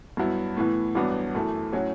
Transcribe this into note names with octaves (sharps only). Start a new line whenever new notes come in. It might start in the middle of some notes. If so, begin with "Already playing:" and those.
G2 F#3 B3 E4
A2 E3 B3
A1 G2 F#3 B3 D4
F#2 E3 A3
A2 F#3 C#4 F#4